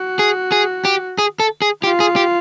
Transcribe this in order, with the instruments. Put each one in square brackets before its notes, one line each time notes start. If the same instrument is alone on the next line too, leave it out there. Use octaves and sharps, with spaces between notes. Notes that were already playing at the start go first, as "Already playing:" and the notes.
Already playing: [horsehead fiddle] F#4
[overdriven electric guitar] G#4
G#4
G4
G#4
A4
G#4
[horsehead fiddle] F4 [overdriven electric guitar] G4
[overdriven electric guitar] G#4
G4